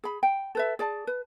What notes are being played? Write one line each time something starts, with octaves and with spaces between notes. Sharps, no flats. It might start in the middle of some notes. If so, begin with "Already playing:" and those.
G#4 B5
G5
A4 B4 E5
G#4 D5 A5
B4